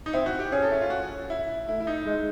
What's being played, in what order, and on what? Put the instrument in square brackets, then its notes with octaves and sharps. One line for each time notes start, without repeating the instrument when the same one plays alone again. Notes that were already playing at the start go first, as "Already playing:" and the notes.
[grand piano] D#4
[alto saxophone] C4 [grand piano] E4
[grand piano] F#4
G4
[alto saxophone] C#4 [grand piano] G#4
[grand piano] A4
E4
F4
F#4
E4
[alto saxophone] A3 [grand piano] E4
[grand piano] E4
D#4
[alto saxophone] G#3